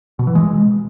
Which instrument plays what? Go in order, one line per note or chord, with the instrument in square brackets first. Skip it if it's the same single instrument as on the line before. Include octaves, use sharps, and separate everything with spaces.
[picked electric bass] B2
E3
G#3